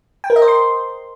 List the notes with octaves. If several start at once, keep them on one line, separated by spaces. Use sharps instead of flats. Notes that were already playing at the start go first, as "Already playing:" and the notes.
G5
A#4
D#5
C5
C6